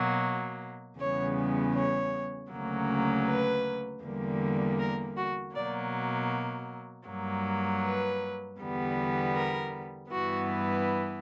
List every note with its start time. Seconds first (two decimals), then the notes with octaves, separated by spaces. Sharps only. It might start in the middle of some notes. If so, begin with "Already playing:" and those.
Already playing: B2 F#3 A#3
0.99 E2 C#3 G3 B3 C#5
1.75 C#5
2.51 D2 C#3 F#3 A#3
3.28 B4
4.03 E2 D3 G3 A#3
4.80 A#4
5.17 F#4
5.56 B2 F#3 A#3 D5
7.07 G2 F#3 A#3
7.84 B4
8.60 E2 D3 G3 B3
9.36 A#4
10.12 G2 E3 B3 F#4